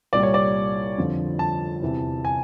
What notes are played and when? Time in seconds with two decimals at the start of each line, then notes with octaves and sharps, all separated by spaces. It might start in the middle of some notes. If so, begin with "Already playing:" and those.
0.13 C2 A#2 G3 D5
0.23 C#5
0.34 D5
0.98 F2 D3 F3
1.39 A5
1.82 E2 C3 E3
2.25 G#5